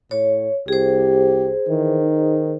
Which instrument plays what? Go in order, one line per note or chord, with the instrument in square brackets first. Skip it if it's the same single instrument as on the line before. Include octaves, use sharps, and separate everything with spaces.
[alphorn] A2 [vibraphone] C#5
[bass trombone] C2 [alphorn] G4 [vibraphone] G#4 C5
[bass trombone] D#3 [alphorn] E3
[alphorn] D#4